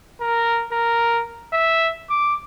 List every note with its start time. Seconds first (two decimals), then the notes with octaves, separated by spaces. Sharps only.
0.21 A#4
0.72 A#4
1.53 E5
2.10 D6